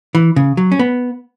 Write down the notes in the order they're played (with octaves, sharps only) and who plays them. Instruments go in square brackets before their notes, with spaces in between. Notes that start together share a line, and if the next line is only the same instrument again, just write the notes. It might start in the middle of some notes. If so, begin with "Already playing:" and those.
[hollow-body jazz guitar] E3
C#3
F#3
C#4
B3